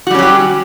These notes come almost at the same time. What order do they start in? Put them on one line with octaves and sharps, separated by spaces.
F#4 G3 C#4 F#3 G4